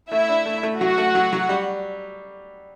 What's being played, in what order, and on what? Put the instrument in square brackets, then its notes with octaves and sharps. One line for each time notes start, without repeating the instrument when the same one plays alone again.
[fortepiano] A3 [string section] E4 E5
[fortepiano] D4
A3
A3
[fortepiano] F#3 [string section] F#4 F#5
[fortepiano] A3
F#3
F#3
G3